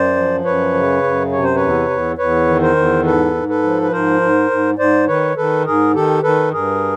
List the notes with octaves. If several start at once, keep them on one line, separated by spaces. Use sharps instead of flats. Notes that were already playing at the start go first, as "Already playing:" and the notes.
Already playing: F#2 C5 D5
F3
F#2 B4 C#5
C#3
F#2
C3 C#5
C5
B4 C#5
E2
E2
E2 B4 C#5
D#3
A#4 C5
E2
G#2 A4 B4
G#2
A4 B4
F3
B4
G#2 A#4 C5
G#2
G#2
G#2 C5 D5
D#3 B4 C#5
D#3 A4 B4
G#2 G#4 A#4
D#3 G4 A4
D#3 A4 B4
G2 G#4 A#4